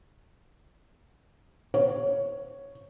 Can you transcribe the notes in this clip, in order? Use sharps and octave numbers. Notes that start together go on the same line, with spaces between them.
C#5